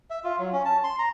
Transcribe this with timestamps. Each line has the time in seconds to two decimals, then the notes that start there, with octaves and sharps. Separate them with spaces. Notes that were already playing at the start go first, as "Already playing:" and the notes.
0.10 E5
0.24 F4
0.39 F#3
0.52 C#4
0.65 A5
0.84 C6
0.99 A#5